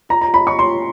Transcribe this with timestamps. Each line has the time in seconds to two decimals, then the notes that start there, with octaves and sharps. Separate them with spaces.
0.09 F4 A#5
0.21 A#5
0.34 C#5 B5
0.47 C#6
0.59 F4 C6